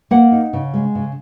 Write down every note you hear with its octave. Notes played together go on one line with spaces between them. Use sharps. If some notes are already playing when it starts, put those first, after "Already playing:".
A#3 F#5
D#4
C#3
G#3
C#3